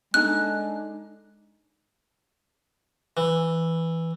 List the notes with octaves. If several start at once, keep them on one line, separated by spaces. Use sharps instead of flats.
G#3 D4 D#4 A4 F#6
E3